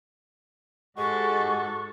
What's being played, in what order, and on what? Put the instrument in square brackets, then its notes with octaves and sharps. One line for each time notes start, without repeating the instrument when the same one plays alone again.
[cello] G#2 A4 [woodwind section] G#3 G4 [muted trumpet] F#4 [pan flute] C#6